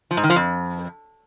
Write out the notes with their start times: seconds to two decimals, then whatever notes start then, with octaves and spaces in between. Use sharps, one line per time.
0.11 F3
0.17 G#2
0.23 D#3
0.30 F3
0.36 F2